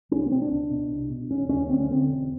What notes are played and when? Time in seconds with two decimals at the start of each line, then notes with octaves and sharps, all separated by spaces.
0.11 C2 C#4
0.21 D4
0.26 B3
0.31 B2 C4
0.42 D4
0.51 C#2
0.71 B2
0.90 C2
1.10 B2
1.30 E1 C#4
1.49 D#2 C#3 C#4
1.69 D2 C4
1.80 C#4
1.89 D3 C4
2.08 E1